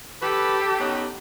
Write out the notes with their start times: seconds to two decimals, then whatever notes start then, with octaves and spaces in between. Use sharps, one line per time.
0.22 G4 A4 B4
0.79 B3 C#4 D#4